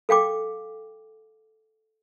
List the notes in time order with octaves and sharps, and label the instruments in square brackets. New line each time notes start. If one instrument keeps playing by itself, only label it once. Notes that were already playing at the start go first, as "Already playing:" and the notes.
[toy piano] A4 F5 G5 D6